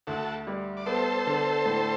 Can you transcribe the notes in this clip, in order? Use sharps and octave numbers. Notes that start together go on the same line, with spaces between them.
D2 F#4 A4
G3
D5
B3 A4 C5
D3
A2